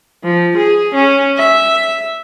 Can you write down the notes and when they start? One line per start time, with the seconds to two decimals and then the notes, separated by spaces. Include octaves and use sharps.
0.24 F3
0.57 G#4
0.94 C#4
1.37 E5